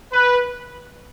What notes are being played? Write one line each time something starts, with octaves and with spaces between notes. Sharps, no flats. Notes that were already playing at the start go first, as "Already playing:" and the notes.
B4